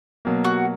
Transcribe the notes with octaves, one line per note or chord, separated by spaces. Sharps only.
B2 F#3 A#3
F#4